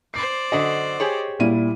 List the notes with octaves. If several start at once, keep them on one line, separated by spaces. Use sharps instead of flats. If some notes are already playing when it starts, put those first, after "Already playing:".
C5 D5 C7
F#2 D3 F#4 D#5
G4 G#4 C#5
A#2 G3 E4 D#7